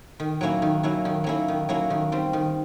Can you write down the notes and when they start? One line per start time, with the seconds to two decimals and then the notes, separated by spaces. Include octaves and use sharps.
0.20 D#3
0.41 F#3 A#3 C#4 E4
0.62 D#3
0.83 F#3 A#3 C#4 E4
1.05 D#3
1.24 F#3 A#3 C#4 E4
1.48 D#3
1.69 F#3 A#3 C#4 E4
1.90 D#3
2.12 G3 C4
2.33 D#3